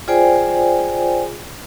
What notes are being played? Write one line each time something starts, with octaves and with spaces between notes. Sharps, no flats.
F4 G#4 C5 D5 G5 G#5